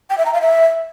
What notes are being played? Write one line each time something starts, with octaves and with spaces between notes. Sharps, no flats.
G5
E5
A#5
F5
E5